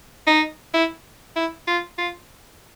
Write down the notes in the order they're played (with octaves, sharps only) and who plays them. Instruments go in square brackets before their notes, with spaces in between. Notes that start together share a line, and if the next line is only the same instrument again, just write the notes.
[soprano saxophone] D#4
E4
E4
F4
F4